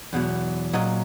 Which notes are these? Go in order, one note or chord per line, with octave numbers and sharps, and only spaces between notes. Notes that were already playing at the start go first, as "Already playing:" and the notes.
E2 B2 F#3
A#2 F#3 D#5